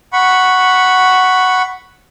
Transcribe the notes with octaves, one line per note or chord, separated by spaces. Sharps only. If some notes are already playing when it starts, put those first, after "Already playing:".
F#5 B5 C#6